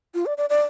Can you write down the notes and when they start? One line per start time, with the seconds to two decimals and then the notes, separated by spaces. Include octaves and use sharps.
0.14 F4
0.26 D5
0.38 D5
0.50 D5